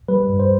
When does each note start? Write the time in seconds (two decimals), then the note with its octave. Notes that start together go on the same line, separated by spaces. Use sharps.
0.08 G3 B4
0.29 G2
0.39 C5